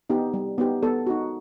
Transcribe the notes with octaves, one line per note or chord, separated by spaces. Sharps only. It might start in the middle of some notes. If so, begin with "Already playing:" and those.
B3 D#4 G4
G3
B3 D#4 G4
B3 A4
D#4 F#4